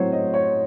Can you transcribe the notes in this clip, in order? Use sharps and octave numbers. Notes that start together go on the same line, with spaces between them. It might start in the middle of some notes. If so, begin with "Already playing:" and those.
Already playing: A2 F#3 C4 C5 C#5
D#5
C#5